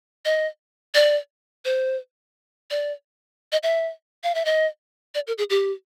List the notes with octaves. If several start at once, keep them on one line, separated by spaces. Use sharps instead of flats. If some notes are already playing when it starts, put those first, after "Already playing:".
D#5
D5
C5
D5
D#5
E5
F5
E5
D#5
D5
A#4
G#4
G4